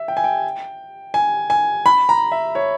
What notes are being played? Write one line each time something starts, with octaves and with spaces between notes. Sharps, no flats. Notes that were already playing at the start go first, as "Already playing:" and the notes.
Already playing: E5
G5
G#5
G5
G#5
G#5
B5
A#5
E5
C#5